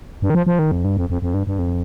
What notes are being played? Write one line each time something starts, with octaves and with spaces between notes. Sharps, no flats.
G2
D#3
F3
F3
D#3
F2
G2
F2
F2
F2
G2
G2
F2